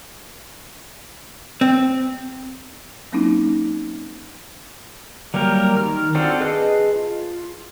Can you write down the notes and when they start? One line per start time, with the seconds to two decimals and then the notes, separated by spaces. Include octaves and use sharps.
1.61 C4
3.13 F#3 A#3 C4 C#4 D#4 E4
5.34 F#3 G3 A#3 G4 A#4
5.76 D#3 F6
6.15 C4 D4 F4 F#4 A4
6.40 G#4 B4 D#5 A5 F#6
6.96 F4